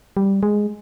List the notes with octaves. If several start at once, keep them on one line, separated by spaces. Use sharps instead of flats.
G3
G#3